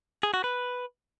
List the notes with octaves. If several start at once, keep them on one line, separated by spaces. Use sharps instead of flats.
G#4
F#4
B4